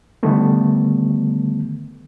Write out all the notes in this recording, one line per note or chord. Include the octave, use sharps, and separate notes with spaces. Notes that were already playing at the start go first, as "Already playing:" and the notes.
D3 D#3 G3 A3 B3